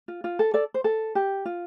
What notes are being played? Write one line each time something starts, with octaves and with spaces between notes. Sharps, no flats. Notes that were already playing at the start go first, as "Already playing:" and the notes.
F4
F4
A4
A4 D5
C5
A4
G4
F4